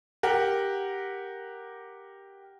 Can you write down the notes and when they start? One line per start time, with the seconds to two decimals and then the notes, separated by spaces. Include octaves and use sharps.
0.23 G4 A#4 F#5